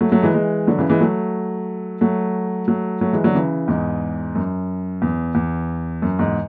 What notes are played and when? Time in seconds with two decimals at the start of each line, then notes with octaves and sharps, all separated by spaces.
0.01 F#3 A3
0.12 F#3 A3
0.22 E3 G#3
0.34 E3 G#3
0.67 D3 F#3
0.78 C#3 E3
0.90 E3 G#3
1.01 F#3 A3
2.01 F#3 A3
2.68 F#3 A3
3.01 F#3 A3
3.13 E3 G#3
3.24 D3 F#3
3.34 C#3 E3
3.68 E2 G#2
4.35 F#2
5.02 E2
5.35 E2
6.02 F#2
6.19 E2 G#2